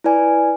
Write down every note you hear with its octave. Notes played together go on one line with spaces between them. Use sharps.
E4 B4 D5 G#5